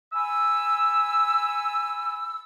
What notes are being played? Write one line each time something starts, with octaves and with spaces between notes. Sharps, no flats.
G#5 B5 E6